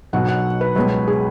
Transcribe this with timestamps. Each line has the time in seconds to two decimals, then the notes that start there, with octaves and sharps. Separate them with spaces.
0.13 B1 B2 F#3 F#5
0.29 F#5
0.61 B4
0.75 C#2 B2 F#3 B4
1.08 G#4